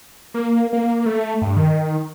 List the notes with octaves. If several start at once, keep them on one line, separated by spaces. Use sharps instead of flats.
A#3
A#3
A3
G2
D#3